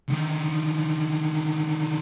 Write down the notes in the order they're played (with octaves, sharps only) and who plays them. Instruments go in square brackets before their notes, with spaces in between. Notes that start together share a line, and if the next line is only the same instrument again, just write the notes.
[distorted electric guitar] D3 D#3